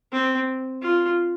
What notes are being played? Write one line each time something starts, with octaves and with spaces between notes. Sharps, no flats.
C4
F4